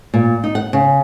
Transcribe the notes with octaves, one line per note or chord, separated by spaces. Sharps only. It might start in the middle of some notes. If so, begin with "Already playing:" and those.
A#2
D#4
F#5
C#3